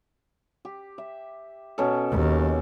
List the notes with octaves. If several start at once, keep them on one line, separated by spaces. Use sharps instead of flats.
G4
E5
B2 C#4 A4
D#2